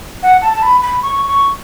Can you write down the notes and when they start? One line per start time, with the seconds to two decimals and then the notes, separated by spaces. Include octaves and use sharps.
0.23 F#5
0.42 A5
0.53 A5
0.63 B5
0.82 B5
1.03 C#6
1.28 C#6